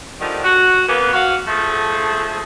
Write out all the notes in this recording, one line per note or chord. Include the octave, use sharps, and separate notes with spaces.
D3 D#3 F3 G3
F#4
C#3 A#3 B3
F#4 F5
F3 A3 G#4 A4